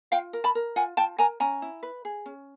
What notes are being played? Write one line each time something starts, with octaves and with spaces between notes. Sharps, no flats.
F4 F5 G5
A#4
A5 B5
A#4
F4 F#5 G#5
F4 G5 A5
A#4 G#5 A#5
C#4 G#5 A#5
E4
B4
G#4
C#4